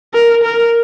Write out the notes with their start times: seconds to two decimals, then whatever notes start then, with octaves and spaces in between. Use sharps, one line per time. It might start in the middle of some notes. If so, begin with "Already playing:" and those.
0.14 A#4
0.43 A#4